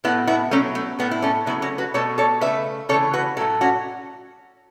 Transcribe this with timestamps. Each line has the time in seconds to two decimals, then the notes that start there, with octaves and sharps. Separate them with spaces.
0.04 A2 F#3 A3 B3 E4
0.27 B3 E4
0.51 B2 F#3 A3 C#4
0.75 A3
0.99 A2 A3 B3
1.11 E4
1.22 A3 C#4
1.46 C#3 F#3 A3 B3 E4
1.62 C#4 F#4
1.78 F#4 B4
1.94 B2 A3 A4 C#5
2.18 A4 C#5
2.41 C#3 A3 B4 E5
2.89 C#3 E3 A3 A4 C#5
3.14 F#4 B4
3.37 A2 F#3 A3 E4 A4
3.61 C#4 F#4